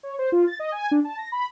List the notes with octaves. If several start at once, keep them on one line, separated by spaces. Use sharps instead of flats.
C#5
C5
F4
A6
D#5
G#5
D4
A5
A#6
B5